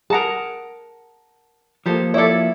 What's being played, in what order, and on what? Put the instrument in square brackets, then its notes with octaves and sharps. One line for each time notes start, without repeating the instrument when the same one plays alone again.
[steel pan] G#4 A#5 [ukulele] A#4 F#5 A5
[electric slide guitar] F3 A#3 [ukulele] G4 A4 C5
[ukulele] E4 A4 [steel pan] C#5 D5 E5